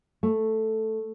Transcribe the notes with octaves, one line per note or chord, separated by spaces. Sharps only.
A3